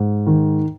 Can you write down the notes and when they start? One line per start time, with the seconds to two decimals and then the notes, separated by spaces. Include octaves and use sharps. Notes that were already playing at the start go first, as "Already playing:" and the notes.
Already playing: G#2
0.26 D#3